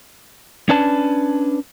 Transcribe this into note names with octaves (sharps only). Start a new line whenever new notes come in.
C#4 D4 B4 A5